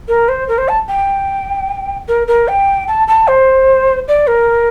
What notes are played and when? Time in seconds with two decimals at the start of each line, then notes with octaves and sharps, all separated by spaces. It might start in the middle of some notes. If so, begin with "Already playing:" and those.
0.08 A#4
0.28 C5
0.48 A#4
0.58 C5
0.68 A5
0.88 G5
2.08 A#4
2.27 A#4
2.48 G5
2.88 A5
3.08 A5
3.28 C5
4.08 D5
4.27 A#4